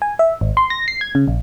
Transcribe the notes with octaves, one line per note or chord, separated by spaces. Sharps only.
G#5
E5
G#1
C6
A#6
C7
G#6
C#3
A#1